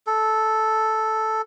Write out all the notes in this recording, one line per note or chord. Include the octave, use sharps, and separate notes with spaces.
A4